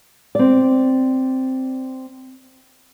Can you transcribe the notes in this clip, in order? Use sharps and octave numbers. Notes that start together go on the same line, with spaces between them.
C4 D5